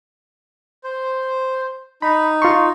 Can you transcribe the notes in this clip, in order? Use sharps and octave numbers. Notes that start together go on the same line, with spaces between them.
C5
D#4 B5
F4 C6 C#6